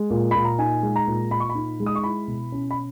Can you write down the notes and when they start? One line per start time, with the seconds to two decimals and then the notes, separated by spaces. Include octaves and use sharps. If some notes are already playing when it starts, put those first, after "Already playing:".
Already playing: G#3
0.10 A#2
0.31 A#2 B5
0.45 A#5
0.58 D#4 G#5
0.83 G#3
0.96 A#5
1.07 A#2
1.31 A#2 B5
1.40 C#6
1.50 B5
1.55 D#4
1.80 G#3
1.86 D#6
1.95 C#6
2.04 E4 B5
2.28 B2
2.52 C#4
2.71 B5